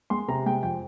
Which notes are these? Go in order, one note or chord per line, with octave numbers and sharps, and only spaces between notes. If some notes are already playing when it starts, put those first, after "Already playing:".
G#3 C6
C3 A#5
G#3 G5
F2 G5